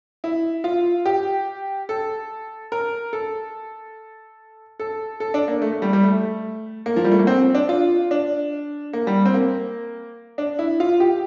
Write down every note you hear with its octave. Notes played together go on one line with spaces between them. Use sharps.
E4
F4
G4
A4
A#4
A4
A4
A4
D4
A#3
A3
A3
G3
G3
A3
A#3
F3
G3
A3
A#3
C4
D4
F4
D4
A#3
G3
C4
A#3
D4
E4
F4
G4